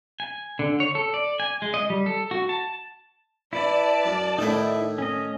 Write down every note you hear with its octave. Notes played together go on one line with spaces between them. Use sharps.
G#5
D3
C#5
A4
D5
G#5
G#3
D#5
G3
A4
F#4
A5
E4 B4 D5 A5
F#2
A2 D#3 A3 D#4 E4
C#4 D#5